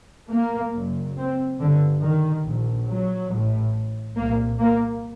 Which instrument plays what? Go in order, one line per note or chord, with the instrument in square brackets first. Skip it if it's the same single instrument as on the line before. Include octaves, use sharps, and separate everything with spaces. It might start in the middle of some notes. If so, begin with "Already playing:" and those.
[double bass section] A#3
F#1 F#2
C4
G1 G2 D3
D#3
A#1 A#2
F#3
A1 A2
C2 A#2 A#3
A#3